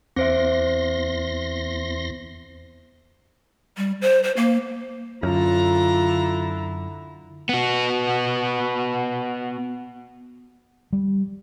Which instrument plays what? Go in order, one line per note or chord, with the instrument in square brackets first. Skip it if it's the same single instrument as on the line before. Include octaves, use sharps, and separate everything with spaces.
[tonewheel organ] E2 C6 A#6 [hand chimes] C4 C5 E5
[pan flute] G3
C5
C5
A#3
[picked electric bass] F#2 [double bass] D3 E4 [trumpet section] D4 A4 A#5 [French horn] F4
[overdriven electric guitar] B3 F#4
[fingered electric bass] G3